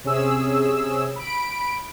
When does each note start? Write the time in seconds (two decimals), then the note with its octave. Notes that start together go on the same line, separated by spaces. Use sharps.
0.04 C3 C#4 G#4 E6
1.16 B5 D7